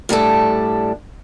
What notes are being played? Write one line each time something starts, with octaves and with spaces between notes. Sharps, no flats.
A2 G3 D4 A4